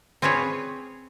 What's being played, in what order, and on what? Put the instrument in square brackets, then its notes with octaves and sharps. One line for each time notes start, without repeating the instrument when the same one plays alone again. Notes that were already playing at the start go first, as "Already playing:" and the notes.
[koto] C4 F4 G#4 B4 C#5